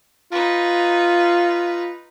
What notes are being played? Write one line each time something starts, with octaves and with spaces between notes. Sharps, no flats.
D#4 F4 B4